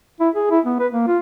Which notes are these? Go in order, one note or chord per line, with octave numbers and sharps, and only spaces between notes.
E4
G#4
E4
B3
B4
A#3
F4